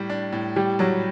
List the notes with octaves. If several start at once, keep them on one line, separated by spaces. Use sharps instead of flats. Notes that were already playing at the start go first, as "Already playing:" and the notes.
Already playing: A2 G3 G4
D4
A2
G3 G4
F#3 G3